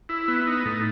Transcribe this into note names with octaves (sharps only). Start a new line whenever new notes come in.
E4
B3
D#4
A2